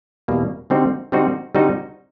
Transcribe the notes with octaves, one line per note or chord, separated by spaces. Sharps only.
E2 B2 G3 A#3
D3 G3 C4 D#4 F#4
D3 G3 C4 D#4 F#4
D3 G3 C4 D#4 F#4